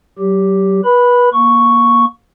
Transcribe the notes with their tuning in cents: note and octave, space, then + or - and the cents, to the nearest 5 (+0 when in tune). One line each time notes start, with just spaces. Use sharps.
F#3 +35 G4 +0
B4 -25 B5 +0
A#3 +25 C#6 +0